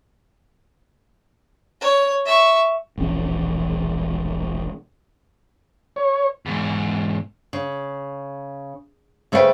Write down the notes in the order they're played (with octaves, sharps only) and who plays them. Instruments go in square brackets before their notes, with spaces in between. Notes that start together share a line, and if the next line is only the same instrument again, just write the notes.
[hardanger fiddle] C#5
E5 C#6
[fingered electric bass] E1 A#1 E3 C#4
[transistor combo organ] C#5
[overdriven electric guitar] E2 G#2
[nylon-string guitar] C#3
C#3 A3 B4 C5 F5 G5